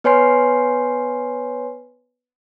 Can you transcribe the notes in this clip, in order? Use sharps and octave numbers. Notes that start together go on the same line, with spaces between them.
B3 B4 C#5 G#5 C6 C7